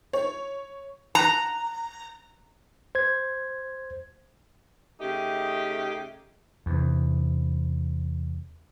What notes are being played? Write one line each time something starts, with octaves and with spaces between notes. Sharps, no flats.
C#5
A#5 F#6 E7
C5 G#6
C#3 A3 D#4 G4
E2 C3